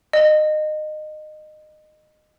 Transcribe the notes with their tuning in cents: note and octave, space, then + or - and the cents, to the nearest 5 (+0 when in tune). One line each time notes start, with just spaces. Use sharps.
D#5 -25